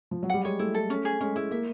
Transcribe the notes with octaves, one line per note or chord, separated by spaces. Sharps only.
F3
F#3
G3 F#5
G#3 C#5
A3 E4
A4
C#4
G#4
G#3 C#4
G#3 E4
A#3 E5